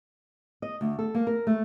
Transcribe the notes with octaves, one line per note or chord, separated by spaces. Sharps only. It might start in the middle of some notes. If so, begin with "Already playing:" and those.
D#5
D2
A4
A#3
A#4
A3